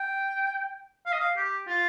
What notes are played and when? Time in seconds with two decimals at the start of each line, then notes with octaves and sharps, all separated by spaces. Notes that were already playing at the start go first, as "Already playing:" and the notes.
Already playing: G5
1.06 F5
1.13 D#5
1.20 F5
1.36 G4
1.67 F4